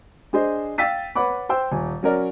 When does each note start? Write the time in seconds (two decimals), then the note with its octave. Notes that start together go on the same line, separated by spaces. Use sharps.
0.33 D4 G#4 C5 D#5
0.78 F5 G5 E6 A6 B6 D#7
1.16 B4 C#5 F#5 B5 D6
1.49 C5 G5 E6
1.71 D#1 G#5
2.03 F#3 C#4 F#4 A#4 D5